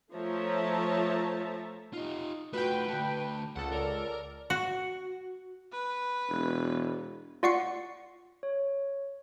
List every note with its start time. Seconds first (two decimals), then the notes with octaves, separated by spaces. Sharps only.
0.14 F3 A3 C#5 E5 A5 A#5
1.93 D#4 F4 G4
2.53 A3 F4 F#4 B4 G5
2.88 D3 A3 A5
3.56 C#2 A4 F#5
3.72 A#4 D5
4.50 F#4
5.72 B4
6.29 E1
7.43 F4 D5 F#5 C#6 C7 C#7
8.43 C#5